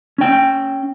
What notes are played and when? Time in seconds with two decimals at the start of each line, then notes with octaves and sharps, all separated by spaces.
0.18 C#4 G5